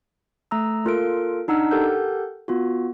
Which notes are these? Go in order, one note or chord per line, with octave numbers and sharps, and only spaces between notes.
A3 A#5 E6
A#3 F4 A4 A#4 C6 D7
D4 D#4 F#5 E6 F6
G4 A4 A#4 F#5 G6
B3 F4 F#4